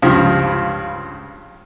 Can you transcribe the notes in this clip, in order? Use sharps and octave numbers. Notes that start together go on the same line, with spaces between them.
C#2 G2 F3